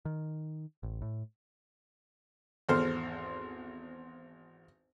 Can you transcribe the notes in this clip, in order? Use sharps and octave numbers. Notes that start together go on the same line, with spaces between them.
D#3
A1
A2
G#1 E2 A4 C5 F6